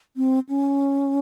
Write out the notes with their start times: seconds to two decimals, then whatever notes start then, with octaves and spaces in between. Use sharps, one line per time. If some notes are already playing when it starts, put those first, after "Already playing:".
0.17 C4
0.49 C#4